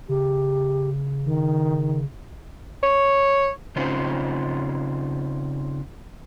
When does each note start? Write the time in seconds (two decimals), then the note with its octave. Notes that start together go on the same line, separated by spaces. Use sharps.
0.09 C#3 G4
1.24 D#3
2.83 C#5
3.76 C#3 C4 C#4 D#4 F4 C5